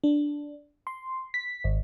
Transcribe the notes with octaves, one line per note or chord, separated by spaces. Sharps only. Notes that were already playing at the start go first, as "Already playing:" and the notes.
D4
C6
B6
G#1